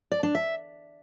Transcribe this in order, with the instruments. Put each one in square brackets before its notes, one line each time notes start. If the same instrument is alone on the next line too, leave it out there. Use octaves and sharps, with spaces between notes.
[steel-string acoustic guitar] D5
D4
E5